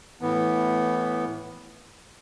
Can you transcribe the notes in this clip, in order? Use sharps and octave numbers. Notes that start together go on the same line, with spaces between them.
A2 E3 B3